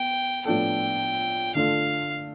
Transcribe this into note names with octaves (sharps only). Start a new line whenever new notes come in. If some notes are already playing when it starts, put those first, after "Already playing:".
Already playing: B3 G5
A2 F3 B3 D4 A4 G5
D3 A3 D4 F4 A4 F5